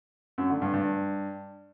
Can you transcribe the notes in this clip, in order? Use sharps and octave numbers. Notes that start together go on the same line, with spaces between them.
F#2
D3
G2
G2